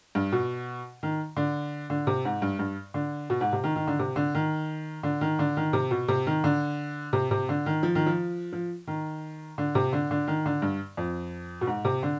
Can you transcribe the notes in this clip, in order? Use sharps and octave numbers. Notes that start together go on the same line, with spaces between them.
G2
B2
D#3
D3
D3
C3
G#2
G2
G2
D3
B2
G#2
C3
D#3
D#3
D3
C3
D3
D#3
D3
D#3
D3
D#3
C3
B2
C3
D#3
D3
C3
C3
D3
D#3
F3
D#3
F3
F3
D#3
D3
C3
D3
D3
D#3
D3
G2
F2
B2
G#2
C3
D3